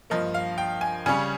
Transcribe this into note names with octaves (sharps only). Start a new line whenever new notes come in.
G2 F3 A#3 D#5
F5
G5
G#5
C#3 G3 C#4 G#5